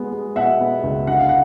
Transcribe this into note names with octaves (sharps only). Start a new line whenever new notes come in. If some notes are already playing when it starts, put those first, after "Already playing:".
Already playing: G#3 B3
G#3
B2 E5 F#5
B3
C#2
D3 F#5
F5
F#5